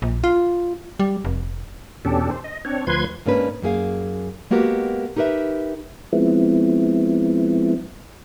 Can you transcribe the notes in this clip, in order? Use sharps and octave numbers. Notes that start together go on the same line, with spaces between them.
A#1
F4
G3
F1
E2 B2 C#4 D4 G4 A4
C5
D#5
C4 D4 C#5
D2 F3 B4 C6 G#6
G#2 A#3 C#4 D4 B4
F#2 A#3 G#4 F5
G#3 A#3 B3 F#4 G4 A#4
D#4 G4 A#4 B4 E5
F3 G#3 B3 C4 E4